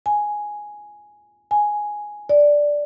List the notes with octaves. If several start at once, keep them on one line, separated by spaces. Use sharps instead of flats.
G#5
G#5
D5